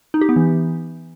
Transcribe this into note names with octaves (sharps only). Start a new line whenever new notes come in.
D#4
G4
B3
E3